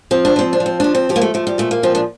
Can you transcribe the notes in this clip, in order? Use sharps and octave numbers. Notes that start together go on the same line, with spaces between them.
F3 C4
D4
F3 C4
D4
F3
C4
F3 D4
C4
F3 G4
A#3
A3
F3 A3
G3
A#2 A3
A#3
F3 C4
D4